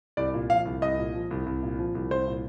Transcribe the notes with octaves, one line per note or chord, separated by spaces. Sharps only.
C2 D5
A#2
F3 F5
C2
C2 D#5
A#2
F3
C2
C2
A#2
F3
C2
C2 C5
A#2